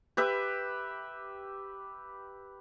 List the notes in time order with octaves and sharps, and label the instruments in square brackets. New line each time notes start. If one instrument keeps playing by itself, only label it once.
[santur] G4 B4 E5